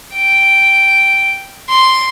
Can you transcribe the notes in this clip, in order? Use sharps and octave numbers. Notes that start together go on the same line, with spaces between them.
G5
C6